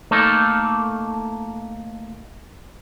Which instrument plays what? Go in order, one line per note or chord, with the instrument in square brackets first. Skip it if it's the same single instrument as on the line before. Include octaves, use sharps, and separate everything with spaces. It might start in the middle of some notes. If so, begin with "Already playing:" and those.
[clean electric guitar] A3 A#3 D#4 A4